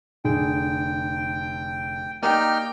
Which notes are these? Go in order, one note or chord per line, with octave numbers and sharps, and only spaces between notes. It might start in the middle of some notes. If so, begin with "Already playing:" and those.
F1 D3 G#4 G5
A#3 D#4 G4 A#4 D5 G5 F6